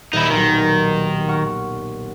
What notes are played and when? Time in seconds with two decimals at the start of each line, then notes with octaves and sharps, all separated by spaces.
0.13 D#1 D#4 E4
0.30 B1 A#2 D#3
1.28 F#5 C#6 F6